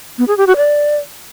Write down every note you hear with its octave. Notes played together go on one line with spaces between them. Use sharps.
B3
G#4
G4
F#4
D5